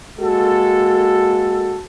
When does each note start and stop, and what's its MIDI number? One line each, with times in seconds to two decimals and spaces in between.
0.19 1.80 56
0.19 1.80 58
0.19 1.80 66
0.19 1.80 69